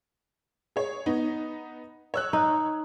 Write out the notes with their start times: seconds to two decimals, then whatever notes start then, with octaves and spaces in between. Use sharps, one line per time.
0.76 G#4 C#5
1.06 B3 D#4
2.14 C#5 E6 F#6
2.33 D#4